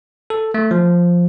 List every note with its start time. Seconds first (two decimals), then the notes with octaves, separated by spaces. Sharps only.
0.30 A4
0.54 A3
0.71 F3